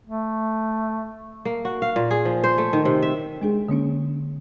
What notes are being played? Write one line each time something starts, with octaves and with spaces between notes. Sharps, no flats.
A3
A#3
F#4
F5
A#2
G#4
F3
C5
A3
D#3
C3
E5
G#3 D4 G#4
D3 A#3 C#4 D4